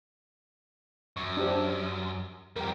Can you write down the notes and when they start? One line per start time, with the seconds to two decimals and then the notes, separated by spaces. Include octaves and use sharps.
1.17 F#2 C#6
1.37 D4 G4 C5
2.56 F2 G3 A#4 G5